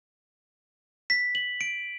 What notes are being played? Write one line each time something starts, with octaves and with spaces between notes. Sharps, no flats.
B6
F#7
D7